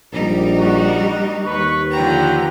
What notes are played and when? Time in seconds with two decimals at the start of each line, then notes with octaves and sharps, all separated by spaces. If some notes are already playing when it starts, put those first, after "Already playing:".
0.13 A#1 G3 D#4
0.59 F#4
1.45 D#2 B4 C#6
1.92 D3 F3 B4 F#5 G5 A#5